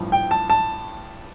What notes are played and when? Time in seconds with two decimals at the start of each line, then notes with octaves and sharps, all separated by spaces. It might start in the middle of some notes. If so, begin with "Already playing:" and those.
Already playing: A1 G2 F3
0.12 G5
0.31 A5
0.50 A5